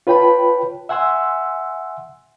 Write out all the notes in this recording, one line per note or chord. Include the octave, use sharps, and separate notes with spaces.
F4 B4 C#5 G5 A5 B5
E5 F#5 G#5 C6 E6